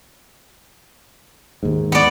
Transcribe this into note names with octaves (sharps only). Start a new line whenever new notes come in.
D#2 G#2
B3 D5